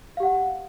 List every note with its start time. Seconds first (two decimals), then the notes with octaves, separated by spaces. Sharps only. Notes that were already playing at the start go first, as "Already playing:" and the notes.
0.17 F5
0.20 G4
0.23 F#5